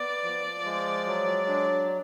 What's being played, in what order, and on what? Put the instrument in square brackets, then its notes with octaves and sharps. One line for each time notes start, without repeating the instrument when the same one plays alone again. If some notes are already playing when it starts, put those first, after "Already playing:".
Already playing: [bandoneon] B3 [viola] D5
[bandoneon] F3
G#3
F#3
D4